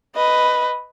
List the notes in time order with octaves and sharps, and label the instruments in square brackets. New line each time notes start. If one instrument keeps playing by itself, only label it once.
[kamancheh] B4 D#5